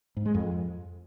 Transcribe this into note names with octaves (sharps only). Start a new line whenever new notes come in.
G#2
G#3
F2